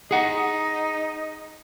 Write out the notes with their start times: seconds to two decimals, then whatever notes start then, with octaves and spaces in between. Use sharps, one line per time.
0.11 D#4 G#4 F#5